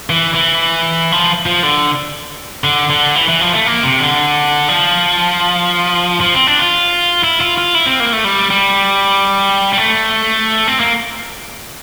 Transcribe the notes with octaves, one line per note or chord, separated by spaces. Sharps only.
E3
E3
F3
F3
D3
D3
D3
E3
E3
F3
A3
A#3
C3
D3
F3
F3
C4
D4
F4
E4
F4
F4
E4
C4
A#3
A3
G3
G3
G3
A3
C4
A#3